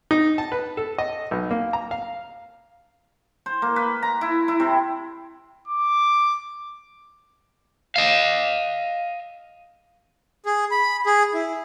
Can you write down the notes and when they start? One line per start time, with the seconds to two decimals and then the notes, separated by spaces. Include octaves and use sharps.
0.11 D#4
0.38 A5
0.52 B4
0.77 A4
0.98 D#5
1.31 B1
1.51 A#3
1.73 A#5
1.91 F5
3.46 C5
3.62 A#3
3.76 B4
4.03 A#5
4.21 E4
4.48 E4
4.60 C3
5.67 D6
7.96 D#5 F5
10.46 G#4
10.71 B5
11.06 G#4
11.34 E4